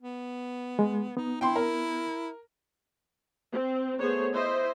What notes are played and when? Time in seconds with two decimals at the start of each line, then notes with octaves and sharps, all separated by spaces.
0.02 B3
0.79 G#3
1.17 B3 D#4
1.41 E4 G5 C6
1.56 A#4
3.53 C4
3.99 A3 B3 G#4 C5 C#5
4.33 E4 C5 D#5 E5